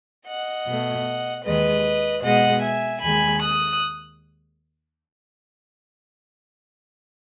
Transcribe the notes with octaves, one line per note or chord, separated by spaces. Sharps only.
D#5 F#5
B2 A3
D#2 D#3 G#3 B4 D#5
B2 G#3 D#5 F#5
E5 G#5
D#2 D#3 G#3 G#5 B5
D#6 F#6